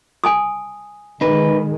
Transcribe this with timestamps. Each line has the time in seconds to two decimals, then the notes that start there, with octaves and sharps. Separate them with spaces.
0.24 G#5 A5 D#6
1.21 D#3 G#3 D#4 B4